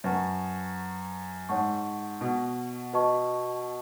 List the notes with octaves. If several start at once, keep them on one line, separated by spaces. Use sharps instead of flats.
F#2 B4 F#5 A5 C#6
G#2 C#5 F#5 A5 C#6
B2
F#4 B4 D#5 A5 C#6